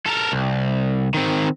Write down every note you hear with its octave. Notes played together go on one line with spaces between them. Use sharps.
A4 A#4
C2
D#3 C4